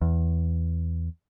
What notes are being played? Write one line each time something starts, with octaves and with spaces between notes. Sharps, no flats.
E2